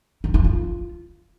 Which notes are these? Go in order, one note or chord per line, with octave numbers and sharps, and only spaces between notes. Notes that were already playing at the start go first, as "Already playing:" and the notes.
D#4
E4
F4